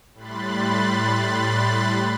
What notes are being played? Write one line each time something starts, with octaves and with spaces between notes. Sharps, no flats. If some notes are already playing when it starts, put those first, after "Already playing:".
A2 G3 B5 C6 F#6 A6